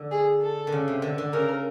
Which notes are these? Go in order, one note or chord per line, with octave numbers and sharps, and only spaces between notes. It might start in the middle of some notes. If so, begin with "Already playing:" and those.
Already playing: D3
G#4
A4
D3
C#3
C3
D3
D3
C#3 A#4